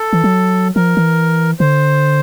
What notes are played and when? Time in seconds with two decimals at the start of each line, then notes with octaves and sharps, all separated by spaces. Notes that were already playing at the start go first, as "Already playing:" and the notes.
Already playing: A4
0.13 E3
0.24 F#3
0.76 F3 A#4
0.97 E3
1.60 D3 C5